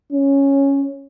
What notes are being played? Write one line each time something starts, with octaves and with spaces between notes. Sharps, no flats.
C#4